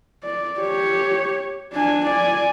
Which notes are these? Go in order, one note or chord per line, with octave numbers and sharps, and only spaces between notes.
D5
G4 C#5
D4 G#5
D5 G#5